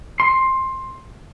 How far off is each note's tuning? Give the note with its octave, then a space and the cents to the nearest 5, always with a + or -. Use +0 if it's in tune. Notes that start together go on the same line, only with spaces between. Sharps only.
C6 +15